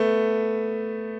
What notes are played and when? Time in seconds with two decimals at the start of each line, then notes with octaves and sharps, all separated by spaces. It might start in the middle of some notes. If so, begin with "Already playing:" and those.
Already playing: A3 B3